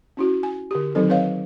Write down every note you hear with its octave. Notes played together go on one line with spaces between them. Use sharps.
C#4 E4 F#4
G#5
D3 G4
D#3 F#3 C4 D#4 A4
C4 B4 C#5 D#5 F5